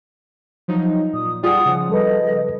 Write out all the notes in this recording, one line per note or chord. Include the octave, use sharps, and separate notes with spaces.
F3 F#3 D#4
A#2 D#6
G3 F4 G#4 F#5 D#6
C#3 F3
G3 A4 B4 D#5